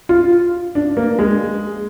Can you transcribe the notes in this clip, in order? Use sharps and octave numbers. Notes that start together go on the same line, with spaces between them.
F4
D4
A#3
G#3